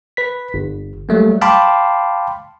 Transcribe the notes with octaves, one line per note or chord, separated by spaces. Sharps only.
B4 B6
G1
F#3 G3 A3 A#3
F5 G5 A5 B5 C6 D6